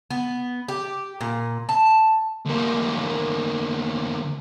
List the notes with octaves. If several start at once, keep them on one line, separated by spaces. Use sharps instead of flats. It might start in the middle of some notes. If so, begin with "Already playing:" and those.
B3
G4
A#2
A5
D2 A#3